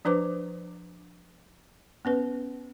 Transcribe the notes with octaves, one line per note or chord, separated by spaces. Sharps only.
F3 D4 B4 C5 D6
B3 C#4 B4